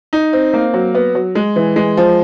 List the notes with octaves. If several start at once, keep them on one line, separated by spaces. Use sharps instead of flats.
D#4
C4
A#3
F#3
B3
F#3
G#3
E3
G#3
F3